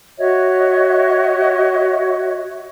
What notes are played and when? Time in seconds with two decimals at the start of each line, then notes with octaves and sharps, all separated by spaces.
0.18 F#4 C#5 D#5 E5